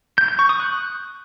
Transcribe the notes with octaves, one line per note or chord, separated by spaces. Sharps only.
G6
G6
C#6
D#6
F#6